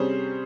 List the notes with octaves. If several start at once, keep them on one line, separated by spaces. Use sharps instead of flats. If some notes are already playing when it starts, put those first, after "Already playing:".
Already playing: C3 G3 C#4 G#4 C5